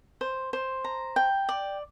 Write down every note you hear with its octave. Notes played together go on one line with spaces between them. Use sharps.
C5
C5
A#5
G5
D5